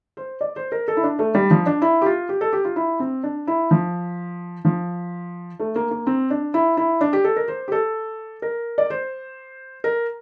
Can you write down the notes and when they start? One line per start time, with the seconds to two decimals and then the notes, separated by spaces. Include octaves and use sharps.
0.17 C5
0.41 D5
0.56 C5
0.72 A#4
0.88 A4
0.97 E4
1.03 D4
1.19 A3
1.35 G3
1.51 F3
1.66 D4
1.82 E4
2.02 G4
2.06 F4
2.29 G4
2.41 A4
2.53 G4
2.65 F4
2.76 E4
3.00 C4
3.23 D4
3.47 E4
3.71 F3
4.65 F3
5.60 A3
5.76 A#3
5.91 A#3
6.07 C4
6.30 D4
6.54 E4
6.77 E4
7.01 D4
7.13 G4
7.24 A4
7.36 A#4
7.48 C5
7.68 G4
7.72 A4
8.42 A#4
8.78 D5
8.90 C5
9.84 A#4